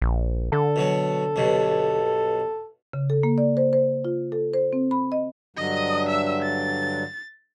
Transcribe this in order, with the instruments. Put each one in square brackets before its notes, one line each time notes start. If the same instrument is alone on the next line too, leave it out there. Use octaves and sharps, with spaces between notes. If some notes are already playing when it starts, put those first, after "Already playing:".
[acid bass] A#1
[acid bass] D3 [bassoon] A4
[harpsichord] B2 F#3
B1 G2 B2
[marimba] C#3
A4
A#3
D5
C5
C5
F4
A4
C5
C4
B5
D#5
[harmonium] G2 D3 F#3 [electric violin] D#5 D#6
[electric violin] E5 E6
A6